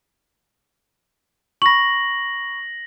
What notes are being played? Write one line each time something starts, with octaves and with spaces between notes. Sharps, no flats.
B5 C#6 A#6 F#7